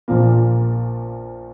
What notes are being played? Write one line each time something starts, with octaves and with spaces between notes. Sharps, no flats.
A#1 A#2 F3 A#3